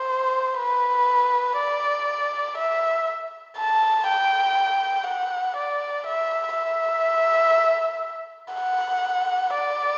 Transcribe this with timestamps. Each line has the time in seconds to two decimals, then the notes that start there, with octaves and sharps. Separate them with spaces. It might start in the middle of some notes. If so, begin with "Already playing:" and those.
Already playing: C5
0.59 B4
1.58 D5
2.58 E5
3.57 A5
4.07 G5
5.06 F#5
5.56 D5
6.06 E5
6.55 E5
8.54 F#5
9.54 D5